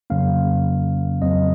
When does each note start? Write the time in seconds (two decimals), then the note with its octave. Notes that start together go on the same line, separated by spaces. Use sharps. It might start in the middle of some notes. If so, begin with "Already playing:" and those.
0.10 F2 C#3 F#3 A#3 C#4 F5
1.22 F2 C#3 F#3 C4 D#5